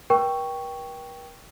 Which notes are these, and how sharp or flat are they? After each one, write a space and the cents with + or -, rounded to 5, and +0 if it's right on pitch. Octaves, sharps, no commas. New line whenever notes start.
A#4 +45 G5 +0 C#6 +0